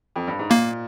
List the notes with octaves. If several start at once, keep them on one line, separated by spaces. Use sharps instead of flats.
F2
G2
G#2
A#2 A#3